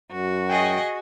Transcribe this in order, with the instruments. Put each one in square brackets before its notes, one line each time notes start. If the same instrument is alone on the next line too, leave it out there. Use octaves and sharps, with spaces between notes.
[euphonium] F#2 [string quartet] F#4
[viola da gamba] G#4 D#5 [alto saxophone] G5